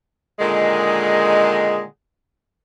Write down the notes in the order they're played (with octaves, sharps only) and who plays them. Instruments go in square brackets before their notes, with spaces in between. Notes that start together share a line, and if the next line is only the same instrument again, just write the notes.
[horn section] A#2 D3 D#3 G#3